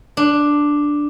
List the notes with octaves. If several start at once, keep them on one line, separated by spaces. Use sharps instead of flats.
D4